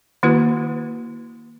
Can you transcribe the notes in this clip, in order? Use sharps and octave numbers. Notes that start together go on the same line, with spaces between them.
D#3 A#3 E4 F#4 B4